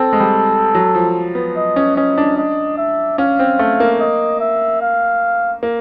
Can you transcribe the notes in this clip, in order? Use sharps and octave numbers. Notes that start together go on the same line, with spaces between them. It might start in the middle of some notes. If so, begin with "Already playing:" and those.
Already playing: C4 A4
G#3
G3
F#3
F3
B3
D#5
C#4
C#4 D#5
D4
D#5
E5
C#4 F5
C4
A3
A#3
D#5
E5
F5
A#3